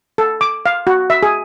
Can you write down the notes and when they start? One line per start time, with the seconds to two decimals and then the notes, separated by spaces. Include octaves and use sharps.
0.18 A4
0.41 D6
0.66 F5
0.87 F#4
1.10 E5
1.23 G#4